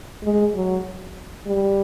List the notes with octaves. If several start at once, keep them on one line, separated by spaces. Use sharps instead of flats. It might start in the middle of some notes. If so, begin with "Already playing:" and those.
G#3
F#3
G3